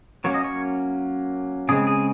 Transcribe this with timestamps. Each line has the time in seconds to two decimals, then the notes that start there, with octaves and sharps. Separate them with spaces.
0.24 F#3 A#3 C#4 C#5
0.34 D#5
0.44 C#5
1.69 C#3 G#3 C4 G#4
1.87 G#4